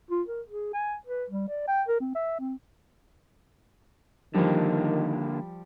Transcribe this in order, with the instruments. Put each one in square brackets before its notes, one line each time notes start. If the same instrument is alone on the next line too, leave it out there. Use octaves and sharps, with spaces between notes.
[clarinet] F4
A#4
G#4
G#5
B4
G3
D5
G5
A#4
C4
E5
C4
[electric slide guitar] D3 A#3 [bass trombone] D#3 [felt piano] F3 G3